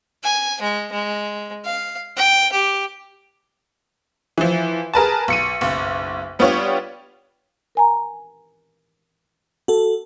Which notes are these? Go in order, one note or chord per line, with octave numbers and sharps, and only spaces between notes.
G#5
G#3
G#3
F5
G5
G4
E3 F3
G#4 A#4 B4 A5
B1 C#7 D#7
F#1 B1
G3 B3 D4 F4 G4 C#5
A#4 G#5 A#5
F#4 A4